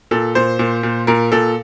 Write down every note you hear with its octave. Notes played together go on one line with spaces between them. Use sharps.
A#2 A4
A#2 C5
A#2
A#2
A#2 A#4
A#2 A4